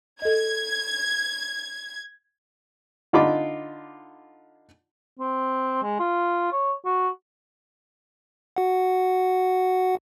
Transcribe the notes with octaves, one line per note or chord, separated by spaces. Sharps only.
A4 D#5 G#6
D3 D#4 F4 B5 D6
C4
G#3
F4
C#5
F#4
F#4 F#5